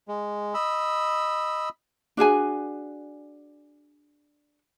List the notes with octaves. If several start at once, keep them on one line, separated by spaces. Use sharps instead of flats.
G#3
D#5 B5 E6
D4 F#4 G#4 G#5